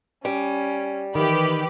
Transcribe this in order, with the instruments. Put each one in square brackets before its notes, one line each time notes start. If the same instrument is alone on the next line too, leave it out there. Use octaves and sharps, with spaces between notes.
[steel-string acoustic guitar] G3 [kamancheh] C#4
[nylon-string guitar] D#3 [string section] E3 G4 B4 [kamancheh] B5